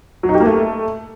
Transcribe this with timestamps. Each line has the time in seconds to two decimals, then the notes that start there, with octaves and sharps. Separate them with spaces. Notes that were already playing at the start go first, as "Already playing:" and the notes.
0.23 F#3
0.29 D#4
0.35 G4
0.40 A#3
0.46 A3